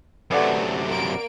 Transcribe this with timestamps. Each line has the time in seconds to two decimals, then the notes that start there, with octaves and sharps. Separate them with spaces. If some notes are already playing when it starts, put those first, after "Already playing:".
0.31 F#2 C3 A3 B4 D5 F#5
0.88 A#3 D7